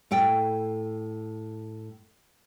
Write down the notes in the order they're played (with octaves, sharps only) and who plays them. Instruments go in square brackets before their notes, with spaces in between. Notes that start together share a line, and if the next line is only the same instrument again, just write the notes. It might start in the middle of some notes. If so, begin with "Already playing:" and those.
[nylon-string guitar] A2 A4 G5